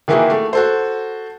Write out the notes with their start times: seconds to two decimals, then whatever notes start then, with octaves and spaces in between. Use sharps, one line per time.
0.08 D#3 E3 A#3 E4 F#4 G#4
0.31 A3
0.53 F#4 A4 C5